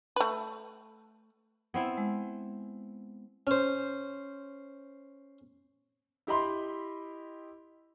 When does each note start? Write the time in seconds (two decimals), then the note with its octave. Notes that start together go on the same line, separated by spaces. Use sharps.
0.16 A3 B4
1.74 B3 C4 E4
1.98 G#3
3.47 C#4 C5
6.27 E4 G4 D#5 B5 C6